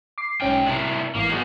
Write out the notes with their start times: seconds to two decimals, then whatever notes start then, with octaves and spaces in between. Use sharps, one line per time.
0.18 D6 C7
0.41 B1 G#2 C#4 G5 F6
0.66 C3 D4 E4 A#4
1.15 G#1 E3 A#3 D6
1.29 B3 D#4 F#4 G#4 G#6